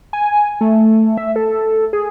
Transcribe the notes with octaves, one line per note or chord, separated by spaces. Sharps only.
G#5
A3
E5
A4
G#4